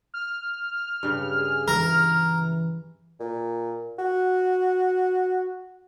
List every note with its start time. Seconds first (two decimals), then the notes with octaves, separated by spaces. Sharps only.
0.14 F6
1.03 G2 C#3
1.39 G#4
1.68 E3 A#4
3.20 A#2
3.98 F#4